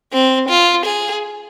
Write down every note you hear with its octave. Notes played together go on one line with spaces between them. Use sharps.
C4
F4
G#4